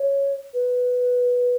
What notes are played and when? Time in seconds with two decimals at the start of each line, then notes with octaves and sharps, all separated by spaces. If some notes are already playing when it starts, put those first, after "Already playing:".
Already playing: C#5
0.54 B4